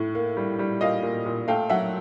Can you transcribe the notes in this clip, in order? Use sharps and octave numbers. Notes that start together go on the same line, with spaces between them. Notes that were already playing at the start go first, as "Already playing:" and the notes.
Already playing: A2
A#3
G3
G3
A#2 D#5 F5
A#2
A#2
A3 F5 G5
F#3 E5 F#5